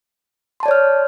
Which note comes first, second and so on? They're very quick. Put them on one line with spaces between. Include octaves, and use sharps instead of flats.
C6 A5 D5 C#5 F6